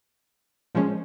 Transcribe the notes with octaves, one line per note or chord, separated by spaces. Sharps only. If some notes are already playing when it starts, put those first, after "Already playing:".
A#2 F3 G#3 C#4